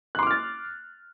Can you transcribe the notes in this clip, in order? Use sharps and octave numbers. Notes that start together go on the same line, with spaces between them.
C6 D6 F6 F#6 A6